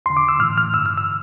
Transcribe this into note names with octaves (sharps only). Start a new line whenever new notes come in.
E2 D3 C6
D6
E6
A2 E3 F6
F6
G2 D3 E6
F6
E6